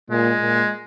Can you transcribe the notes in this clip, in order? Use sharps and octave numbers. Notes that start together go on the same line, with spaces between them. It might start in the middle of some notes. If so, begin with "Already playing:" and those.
A#2 G#3
A#2